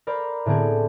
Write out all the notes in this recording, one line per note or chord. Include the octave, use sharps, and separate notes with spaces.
A#4 C5 D5 A#5 B5
A2 D3 B3 C4 G#4